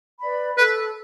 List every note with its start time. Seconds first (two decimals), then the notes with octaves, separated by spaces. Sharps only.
0.20 B4 D5 B5
0.58 A4 B4